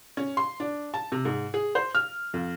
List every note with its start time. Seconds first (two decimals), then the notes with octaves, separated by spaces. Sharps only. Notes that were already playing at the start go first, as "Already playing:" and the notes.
0.17 C#4
0.37 C6
0.60 D4
0.94 A5
1.12 C3
1.25 G#2
1.54 G#4
1.75 C5
1.95 F6
2.34 F2